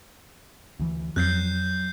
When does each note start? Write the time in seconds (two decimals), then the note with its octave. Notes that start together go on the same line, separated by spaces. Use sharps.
0.80 D2 E3
1.16 F2 F#3 F#6 G6 C7